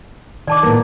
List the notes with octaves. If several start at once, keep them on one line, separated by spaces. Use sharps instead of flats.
D#3 D5 A5 D6
A2 A#3 B3 A#4